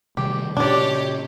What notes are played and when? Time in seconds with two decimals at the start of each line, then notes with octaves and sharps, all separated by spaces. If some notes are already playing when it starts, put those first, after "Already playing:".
0.17 C3 D#3 G3 G4
0.57 A#2 C#3 D4 G4 C#5 D5 D6